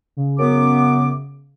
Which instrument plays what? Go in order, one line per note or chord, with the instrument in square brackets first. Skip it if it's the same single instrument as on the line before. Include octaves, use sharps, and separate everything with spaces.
[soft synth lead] C#3
[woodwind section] F#2 B3 D6